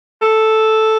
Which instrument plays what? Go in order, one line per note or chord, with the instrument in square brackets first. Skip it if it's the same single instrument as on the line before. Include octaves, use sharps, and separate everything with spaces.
[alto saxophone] A4